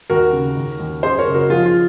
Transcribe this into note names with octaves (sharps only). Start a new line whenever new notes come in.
D#2 F#4 A#4
C#3
D#2
D#2
F#2 G#4 C5
A#4 C#5
F#1
F#4 A#4
F3 F4 G#4
F4